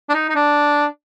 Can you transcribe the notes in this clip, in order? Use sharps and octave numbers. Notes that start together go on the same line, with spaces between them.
D4
D#4
D#4
D4